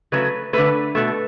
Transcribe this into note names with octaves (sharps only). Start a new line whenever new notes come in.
C#3 F#3 A3 B4
D3 A3 B4
B2 A3